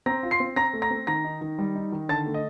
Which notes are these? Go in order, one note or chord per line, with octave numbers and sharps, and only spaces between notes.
C4 A#5 A#6
F4
C6 C7
C4
C4 A#5 A#6
A3
A#5 A#6
C4
D#3 A#5 A#6
D#4
D#3
G3
D#4
D#3
D3 A5 A6
A3
D#5